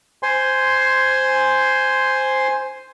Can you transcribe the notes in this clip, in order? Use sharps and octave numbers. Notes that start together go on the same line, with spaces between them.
C5 G#5 C6